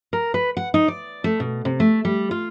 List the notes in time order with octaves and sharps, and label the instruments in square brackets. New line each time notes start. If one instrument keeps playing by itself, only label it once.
[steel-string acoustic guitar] A#4
B4
F#5
D#4
D5
A3
B2
C3
A3
G3
F4